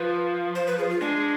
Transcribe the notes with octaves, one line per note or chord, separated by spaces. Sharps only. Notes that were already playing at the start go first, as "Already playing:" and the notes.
Already playing: F3 B4
C5
B4
G#4
F4
G#3 D4